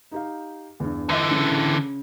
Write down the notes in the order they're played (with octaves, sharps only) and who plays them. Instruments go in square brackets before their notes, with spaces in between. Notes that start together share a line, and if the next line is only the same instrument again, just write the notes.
[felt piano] D#4 G4 F5
E2 G2
[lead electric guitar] D3 E3 [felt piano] D#5 E5 G6
[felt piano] C#3